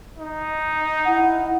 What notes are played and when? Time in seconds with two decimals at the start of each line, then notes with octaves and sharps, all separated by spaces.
0.18 D#4
1.05 E4 F#5